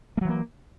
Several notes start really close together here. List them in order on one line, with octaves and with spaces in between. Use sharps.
A3 F#3 E3 A#3